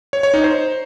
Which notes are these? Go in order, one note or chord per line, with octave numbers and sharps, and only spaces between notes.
C#5
C#5
D#4
C5